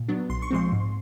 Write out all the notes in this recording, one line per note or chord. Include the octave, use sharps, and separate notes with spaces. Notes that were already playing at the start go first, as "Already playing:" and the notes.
Already playing: A#2
F#3 B3 D4
B1 C6
C#6
A#2 F3 G#3 C4 C6
G#2